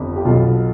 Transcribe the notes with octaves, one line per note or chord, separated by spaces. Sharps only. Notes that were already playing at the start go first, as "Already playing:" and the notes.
Already playing: G1 F2
G4
B1 B2 F4